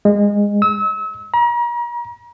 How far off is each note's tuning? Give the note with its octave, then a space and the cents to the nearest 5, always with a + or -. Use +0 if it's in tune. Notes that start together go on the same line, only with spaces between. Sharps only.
G#3 -20
E6 -35
A#5 +40